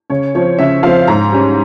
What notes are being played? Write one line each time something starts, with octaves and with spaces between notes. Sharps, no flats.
C#3 C#5
F3 C4 C#5
C#3 E5
F3 C4 F5
G#2 A#5
G3 C#4